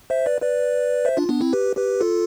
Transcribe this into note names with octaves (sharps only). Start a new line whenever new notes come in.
C5 E5
B4 D5
B4 D5
C5 E5
D4 F4
B3 D4
C4 E4
G4 B4
G4 B4
F4 A4